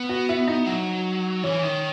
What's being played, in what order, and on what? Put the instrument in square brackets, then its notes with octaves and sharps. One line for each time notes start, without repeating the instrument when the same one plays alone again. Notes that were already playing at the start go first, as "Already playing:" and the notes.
Already playing: [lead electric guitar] B3
[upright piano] F#4
E4
D#4
[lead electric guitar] F#3
[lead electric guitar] E3 [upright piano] C#4
[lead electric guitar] D#3